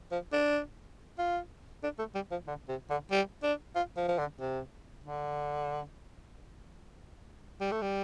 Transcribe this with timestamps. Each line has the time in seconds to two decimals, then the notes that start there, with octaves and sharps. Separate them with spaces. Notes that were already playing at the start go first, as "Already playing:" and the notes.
0.12 F3
0.33 D4
1.18 F4
1.84 D4
1.99 A3
2.15 G3
2.31 F3
2.47 D3
2.69 C3
2.90 D3
3.11 G3
3.43 D4
3.75 F4
3.97 F3
4.08 F3
4.18 D3
4.40 C3
5.04 D3
7.61 G3
7.71 A3
7.82 G3